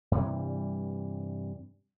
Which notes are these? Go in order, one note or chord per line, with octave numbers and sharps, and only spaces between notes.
G2 C3 E3 G3